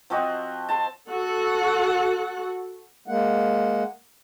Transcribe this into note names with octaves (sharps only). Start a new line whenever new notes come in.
F3 C4 F#4 D#5
A5 C6
F#4 A4 F#5
G#3 A#3 F#5